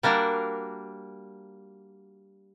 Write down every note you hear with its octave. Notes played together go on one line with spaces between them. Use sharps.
G3 A#3 D4 F#4 A#4